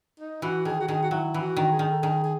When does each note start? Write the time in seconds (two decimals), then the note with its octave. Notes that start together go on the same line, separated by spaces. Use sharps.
0.20 D#4
0.42 E3 F#4
0.65 D#3 G#4
0.80 F#4
0.88 D#3 G#4
1.02 F#4
1.11 F#3 E4
1.34 E3
1.41 F#4
1.57 D#3
1.72 G#4
1.79 D#3
1.91 A4
2.02 D#3 G#4
2.24 G#4